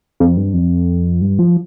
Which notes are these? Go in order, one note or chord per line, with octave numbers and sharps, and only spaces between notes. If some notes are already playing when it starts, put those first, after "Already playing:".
F2
G2
F2
G2
F3